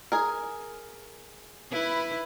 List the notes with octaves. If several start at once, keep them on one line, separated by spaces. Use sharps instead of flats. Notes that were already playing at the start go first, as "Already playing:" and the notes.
G#4 A#4
E4 B4